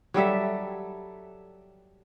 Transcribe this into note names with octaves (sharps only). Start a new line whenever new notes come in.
F#3 G3 A4 E5